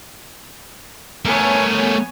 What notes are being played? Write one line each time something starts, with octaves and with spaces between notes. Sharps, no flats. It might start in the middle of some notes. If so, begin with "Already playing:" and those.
A3 B3 A#4 C#5 G#5